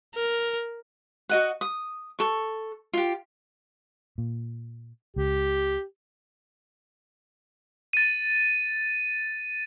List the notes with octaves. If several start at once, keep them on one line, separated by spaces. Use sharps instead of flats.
A#4
F#4 D#5 F#5
D#6
A4 C#6
F4 G4
A#2
C#2 G4
A6 D#7